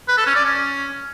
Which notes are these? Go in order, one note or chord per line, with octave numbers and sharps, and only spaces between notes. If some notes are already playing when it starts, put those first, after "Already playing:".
B4
A4
C#4
D5
C#4